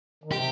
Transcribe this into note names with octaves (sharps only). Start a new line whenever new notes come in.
D#3
C3 G4